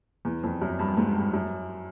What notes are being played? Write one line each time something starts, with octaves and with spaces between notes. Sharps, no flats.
E2
F2
F#2
G2
G#2
G2
F#2